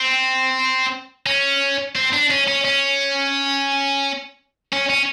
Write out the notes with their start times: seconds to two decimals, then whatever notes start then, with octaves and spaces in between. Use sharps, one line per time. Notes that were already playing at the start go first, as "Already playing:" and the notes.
Already playing: C4
1.26 C#4
1.95 C4
2.13 D4
2.30 C#4
2.47 C#4
2.65 C#4
4.72 C#4
4.89 C#4